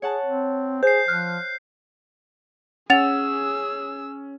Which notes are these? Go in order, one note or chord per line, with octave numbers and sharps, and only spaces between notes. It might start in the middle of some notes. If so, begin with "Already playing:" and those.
G#4 C#5 F#5 A5
C4
G#4 C5 G6 C7
F3 F6 F#6
C#4 G#4 F#5 E6 A6 F7